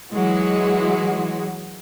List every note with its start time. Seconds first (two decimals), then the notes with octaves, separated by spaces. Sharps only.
0.13 E3 F#3 G#3 F#4